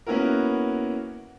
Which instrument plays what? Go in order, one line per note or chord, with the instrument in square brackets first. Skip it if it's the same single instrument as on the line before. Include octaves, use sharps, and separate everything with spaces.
[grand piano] A#3 B3 C#4 E4 F#4 A#4